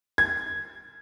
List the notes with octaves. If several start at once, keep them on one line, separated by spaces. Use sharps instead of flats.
G#6